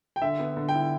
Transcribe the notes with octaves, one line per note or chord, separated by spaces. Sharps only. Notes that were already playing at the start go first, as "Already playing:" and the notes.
G5
D3 E5
B3
D3
G5
E4